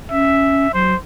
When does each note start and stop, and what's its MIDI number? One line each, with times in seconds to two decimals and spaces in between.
0.11 0.67 61
0.11 0.70 76
0.74 0.94 54
0.74 0.96 72